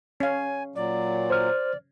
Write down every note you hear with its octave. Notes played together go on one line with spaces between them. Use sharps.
C#4 F5 G#5
A#2 F#3 D5
C5 F6